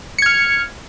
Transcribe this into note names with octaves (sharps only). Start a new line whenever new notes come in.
F6 G#6 C#7